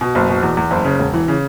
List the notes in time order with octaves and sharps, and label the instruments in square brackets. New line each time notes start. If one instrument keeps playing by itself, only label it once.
[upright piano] B2
F#1
B2
E2
E2
F#1
C#3
E1
E3
C#3